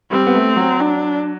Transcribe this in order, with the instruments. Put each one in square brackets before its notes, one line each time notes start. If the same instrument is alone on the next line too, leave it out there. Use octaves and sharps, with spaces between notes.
[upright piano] G3 [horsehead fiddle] C4
[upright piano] B3
A3
F#3
[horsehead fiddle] D4